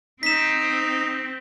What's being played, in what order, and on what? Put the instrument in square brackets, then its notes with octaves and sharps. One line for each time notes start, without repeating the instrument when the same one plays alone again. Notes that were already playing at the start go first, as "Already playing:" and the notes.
[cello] C4 [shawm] D#4 [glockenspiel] B6 E7